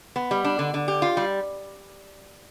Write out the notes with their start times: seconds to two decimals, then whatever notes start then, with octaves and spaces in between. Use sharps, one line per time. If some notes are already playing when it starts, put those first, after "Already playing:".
0.16 B3
0.31 G3
0.44 D4
0.59 D3
0.74 D3
0.88 G4
1.02 F4
1.17 G3